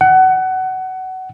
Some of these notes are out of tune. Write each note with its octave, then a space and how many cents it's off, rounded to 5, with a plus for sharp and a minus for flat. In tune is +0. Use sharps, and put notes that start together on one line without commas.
F#5 +20